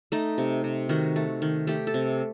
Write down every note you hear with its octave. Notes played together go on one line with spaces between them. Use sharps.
A3 D#4
C3
C3
D#3 F#4
A3
D#3
A3 G4
A4
C3